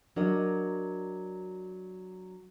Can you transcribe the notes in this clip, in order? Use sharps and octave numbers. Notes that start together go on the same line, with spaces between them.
F#3 D4 A#4 D#5